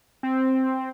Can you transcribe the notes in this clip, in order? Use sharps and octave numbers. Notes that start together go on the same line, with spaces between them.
C4